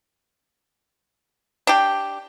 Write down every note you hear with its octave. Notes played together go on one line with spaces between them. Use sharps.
D4 G4